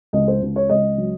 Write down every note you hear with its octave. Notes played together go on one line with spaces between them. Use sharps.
C#2 D#5
C5
C#2
C#5
C#2 D#5
F#3